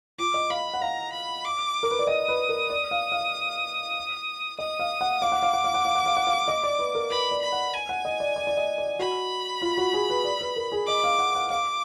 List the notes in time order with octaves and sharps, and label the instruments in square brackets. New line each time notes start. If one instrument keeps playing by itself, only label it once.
[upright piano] F4 [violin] D6
[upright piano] D#5
[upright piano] F5 [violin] B5
[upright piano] F#5
[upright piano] F5 [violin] A#5
[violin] B5
D6
[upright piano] A#4
B4
D5
[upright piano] D#5 [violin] D#6
[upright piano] B4
A#4
D5
F5
F5
[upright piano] D#5 [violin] D#6
[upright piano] F5
F#5
[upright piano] F5 [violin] D6
[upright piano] F#5
F5
F#5
F5
F#5
F5
F#5
F5
F#5
F5
D#5
D5
B4
A#4
[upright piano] B4 [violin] B5
[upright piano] D5
[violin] B5
[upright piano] F#5
[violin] G#5
[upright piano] F#5
D#5
D5
D5
D5
D#5
D5
[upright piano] F#4 [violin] B5
[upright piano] F4
F#4
G#4
B4
D5
B4
A#4
G#4
[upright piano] D#5 [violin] D6
[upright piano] F5
F#5
F#5
[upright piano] F5 [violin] D6